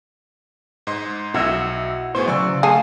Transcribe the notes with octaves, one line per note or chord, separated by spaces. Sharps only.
G#2 D#5 C6
B1 E4 F#4 D#5 E5
A2 B3 G#4 C5
C#3 E3 F#3 D5 C#6 E6
A3 G#4 F5 G#5 A5